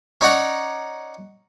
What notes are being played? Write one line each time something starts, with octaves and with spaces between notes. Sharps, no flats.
C#4 D#4 C#5 D5 F#5 A#5